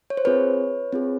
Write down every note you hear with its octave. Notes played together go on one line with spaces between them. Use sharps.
C#5
C5
C4 F4 G#4 B4 C#5
C4 F4 G#4